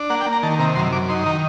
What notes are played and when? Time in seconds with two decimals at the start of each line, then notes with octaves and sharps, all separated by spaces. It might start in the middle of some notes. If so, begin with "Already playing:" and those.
Already playing: D4
0.10 A#3 F#5
0.21 G5
0.26 A#3
0.32 A#5
0.43 D#3 A5
0.59 C3 A#5
0.76 F#2 C6
0.92 F#2 D6
1.09 D#4 C6
1.26 D#3 A#5